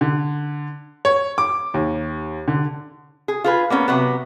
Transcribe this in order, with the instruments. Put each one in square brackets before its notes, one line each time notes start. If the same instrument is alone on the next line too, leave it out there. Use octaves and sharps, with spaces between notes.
[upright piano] D3
C#5
D6
D#2
D3
[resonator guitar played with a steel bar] G#4
F4 G#4 B4
A#3 B3 C#4
C3 F#3 B3